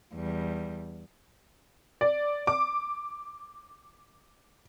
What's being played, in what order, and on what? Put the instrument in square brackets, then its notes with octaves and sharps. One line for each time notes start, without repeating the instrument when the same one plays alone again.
[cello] E2 G3
[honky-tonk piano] D5
D6